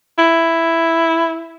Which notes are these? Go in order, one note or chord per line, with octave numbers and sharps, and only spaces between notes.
E4